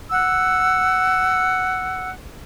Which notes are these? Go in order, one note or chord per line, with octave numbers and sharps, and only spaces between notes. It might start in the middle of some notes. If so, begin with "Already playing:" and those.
F#5 E6